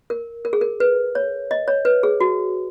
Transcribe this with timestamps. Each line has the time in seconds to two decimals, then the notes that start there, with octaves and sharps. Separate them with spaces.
0.10 A#4
0.45 A#4
0.53 G#4
0.61 A#4
0.80 B4
1.15 C#5
1.51 D#5
1.68 C#5
1.85 B4
2.03 G#4
2.21 F#4